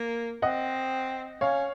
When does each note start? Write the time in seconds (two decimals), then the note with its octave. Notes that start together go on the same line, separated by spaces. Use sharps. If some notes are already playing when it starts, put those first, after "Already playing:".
Already playing: A#3
0.42 C4 D#5 F#5
1.41 C#4 C#5 F5